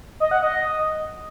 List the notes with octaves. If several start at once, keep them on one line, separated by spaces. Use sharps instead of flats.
D#5
F#5
D#5